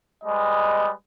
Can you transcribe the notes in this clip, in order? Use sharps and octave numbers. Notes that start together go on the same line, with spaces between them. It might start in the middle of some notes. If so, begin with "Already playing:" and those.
G3 G#3 B4 D#5